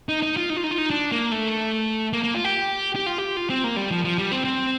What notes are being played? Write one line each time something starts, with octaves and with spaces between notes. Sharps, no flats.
D#4
D#4
F4
D#4
F4
D#4
F4
D#4
D4
A#3
A3
A#3
A#3
F4
G4
G4
F4
G4
F4
C4
A#3
G3
F3
F3
G3
C4
C4